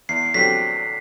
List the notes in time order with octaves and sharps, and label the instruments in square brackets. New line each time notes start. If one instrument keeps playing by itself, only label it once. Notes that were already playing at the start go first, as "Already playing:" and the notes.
[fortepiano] E2 [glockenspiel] C7
[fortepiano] D3 F#3 C4 G4 [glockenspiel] B6